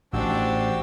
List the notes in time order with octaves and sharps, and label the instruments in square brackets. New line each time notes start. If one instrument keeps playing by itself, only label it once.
[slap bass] A1 [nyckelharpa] D4 C5 [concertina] F#4 G4 E6